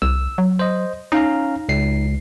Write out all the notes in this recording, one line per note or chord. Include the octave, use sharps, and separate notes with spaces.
C2 E6
F#3
C5 D#5
C#4 D#4 F5 A#5
C#2 C7